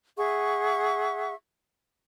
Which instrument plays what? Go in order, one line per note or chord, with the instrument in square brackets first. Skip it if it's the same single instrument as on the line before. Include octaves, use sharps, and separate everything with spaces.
[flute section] G#4 E5 F#5 C#6